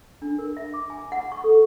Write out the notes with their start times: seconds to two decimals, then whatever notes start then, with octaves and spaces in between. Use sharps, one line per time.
0.22 D4
0.39 A#4
0.57 E5
0.74 D6
0.90 G#5
1.12 F#5
1.32 C#6
1.44 A4